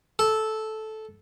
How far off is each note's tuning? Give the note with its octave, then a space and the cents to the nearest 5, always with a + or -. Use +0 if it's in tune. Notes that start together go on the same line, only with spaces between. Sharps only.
A4 -10